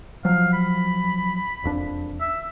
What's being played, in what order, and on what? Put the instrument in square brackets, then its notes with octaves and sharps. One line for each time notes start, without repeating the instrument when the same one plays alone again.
[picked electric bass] F3 F#3 [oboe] F5
[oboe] B5
[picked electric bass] E1 F2 D4
[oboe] E5